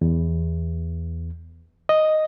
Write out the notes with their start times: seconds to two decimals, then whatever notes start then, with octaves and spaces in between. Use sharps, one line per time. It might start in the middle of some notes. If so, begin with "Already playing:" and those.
0.01 E2
1.89 D#5